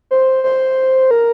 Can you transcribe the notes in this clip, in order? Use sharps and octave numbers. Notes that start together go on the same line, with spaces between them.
C5
C5
A#4